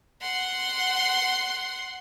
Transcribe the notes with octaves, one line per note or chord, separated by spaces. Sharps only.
F#5 C6